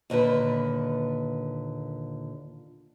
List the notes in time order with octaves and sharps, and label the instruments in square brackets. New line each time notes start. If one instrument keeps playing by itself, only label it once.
[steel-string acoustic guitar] D#2 A#2 D3 B4